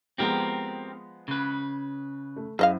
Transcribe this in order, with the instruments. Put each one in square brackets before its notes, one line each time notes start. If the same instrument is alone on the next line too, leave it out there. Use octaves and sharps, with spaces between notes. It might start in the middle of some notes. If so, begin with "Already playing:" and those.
[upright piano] F3 G#3 B3 [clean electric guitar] C4 G4 A#4
[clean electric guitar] C#3 B4
[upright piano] A3
[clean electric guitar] F#2 [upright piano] E4 C5 [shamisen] G#4 D#5 F5